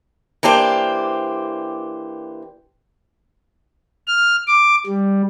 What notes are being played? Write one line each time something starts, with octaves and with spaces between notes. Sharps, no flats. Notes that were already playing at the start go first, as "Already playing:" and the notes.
E3 A#3 D4 G4 C5
F6
D6
G3